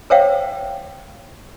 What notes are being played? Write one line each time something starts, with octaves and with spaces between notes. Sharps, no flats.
A#4 C5 C#5 E5 F5 G5